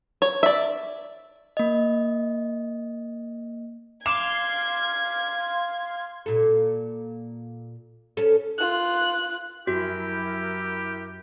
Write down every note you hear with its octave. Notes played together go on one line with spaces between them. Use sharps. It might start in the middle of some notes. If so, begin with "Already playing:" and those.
C#5
D5 E5
A#3 D#5
F5 C6 D6 G#6 E7
A#2 A4
C#4 A4
F4 F#6
F#2 E4 F#4 G4 A#4